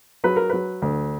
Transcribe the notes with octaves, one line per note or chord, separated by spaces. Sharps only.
F#3 B4
A#4
F#3 B4
D2